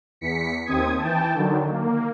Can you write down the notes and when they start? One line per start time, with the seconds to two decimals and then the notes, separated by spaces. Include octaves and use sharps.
0.21 E2 B6 C#7
0.66 D#2 C4 D#6 G#6
0.98 E3 G5 A5
1.35 D3 D#3 F#3
1.70 A#3